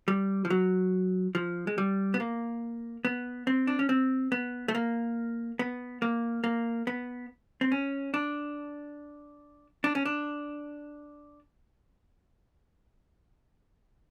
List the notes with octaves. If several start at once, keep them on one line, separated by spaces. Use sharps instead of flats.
G3
F3
F#3
F3
G#3
G3
B3
A#3
B3
C4
D4
C#4
C4
B3
A3
A#3
B3
A#3
A#3
B3
C4
C#4
D4
D4
C#4
D4